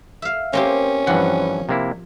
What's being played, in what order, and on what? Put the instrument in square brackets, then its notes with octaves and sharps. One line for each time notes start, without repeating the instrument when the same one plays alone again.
[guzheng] E5 F5
[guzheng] A#3 C4 G4 [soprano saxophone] C#4
[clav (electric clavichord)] G2 E3 F#5 [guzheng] F3
[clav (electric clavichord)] C3 A#3 E4